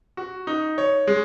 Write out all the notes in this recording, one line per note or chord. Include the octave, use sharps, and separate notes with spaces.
F#4
D#4
C#5
G#3